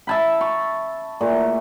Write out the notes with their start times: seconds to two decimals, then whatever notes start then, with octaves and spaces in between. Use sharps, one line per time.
0.07 E5 A5 B5
0.41 C#6
1.21 A#2 A3